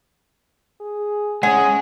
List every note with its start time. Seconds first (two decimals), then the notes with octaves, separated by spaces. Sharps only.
0.81 G#4
1.43 G#3 C#4 G#4 F#5